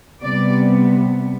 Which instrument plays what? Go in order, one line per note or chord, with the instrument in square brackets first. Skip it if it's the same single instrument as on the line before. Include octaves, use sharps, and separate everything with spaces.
[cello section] C3 G3 B3 D5